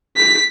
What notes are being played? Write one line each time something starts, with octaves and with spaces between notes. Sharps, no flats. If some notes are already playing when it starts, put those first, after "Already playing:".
B6